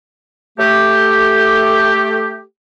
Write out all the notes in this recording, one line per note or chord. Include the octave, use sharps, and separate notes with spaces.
A3 G4